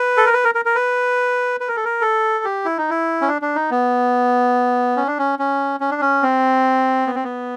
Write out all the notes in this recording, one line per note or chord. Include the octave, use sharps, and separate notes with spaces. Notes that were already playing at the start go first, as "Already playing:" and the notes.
Already playing: B4
A4
A#4
B4
A#4
A#4
A#4
B4
B4
A#4
A4
A#4
A4
G4
E4
D#4
E4
C#4
D4
D4
D#4
B3
C#4
D4
C#4
C#4
C#4
D4
C#4
C4
B3
C4
B3